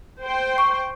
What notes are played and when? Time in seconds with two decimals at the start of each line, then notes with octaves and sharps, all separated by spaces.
0.21 C5 G5 C6
0.58 C#6